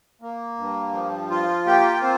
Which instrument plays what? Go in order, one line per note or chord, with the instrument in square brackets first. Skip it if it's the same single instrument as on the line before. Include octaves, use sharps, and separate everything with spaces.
[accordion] A#3
G2
F3
F4
A#3 G4 G5
C4 C5